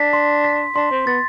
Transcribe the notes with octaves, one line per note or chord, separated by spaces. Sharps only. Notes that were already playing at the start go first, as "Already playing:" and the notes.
Already playing: D4 B6
C6
B6
D4 C6
C4
B3 A6